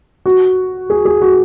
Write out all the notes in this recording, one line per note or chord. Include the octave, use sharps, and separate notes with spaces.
F#4
G#4
G#4
F#4